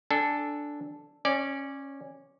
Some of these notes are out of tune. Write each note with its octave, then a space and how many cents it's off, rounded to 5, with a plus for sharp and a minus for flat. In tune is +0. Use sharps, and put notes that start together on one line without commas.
D4 -5 A4 +0 G#5 -15
C#4 -15 D5 +0